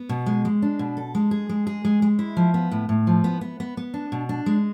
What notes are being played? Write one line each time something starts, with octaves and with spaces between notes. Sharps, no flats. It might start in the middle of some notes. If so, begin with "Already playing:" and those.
Already playing: B3
B2
G#3
G#3
D4
B2
A4
G#3
G#4
G#3
G#4
G#3
G#3
E4
F3
B3
A2
A2
F3
B3
B3
B3
B3
D4
B2
D4
G#3